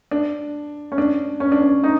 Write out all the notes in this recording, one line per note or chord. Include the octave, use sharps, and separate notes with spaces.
D4
C#4
D4
C#4
D4
C#4
D#4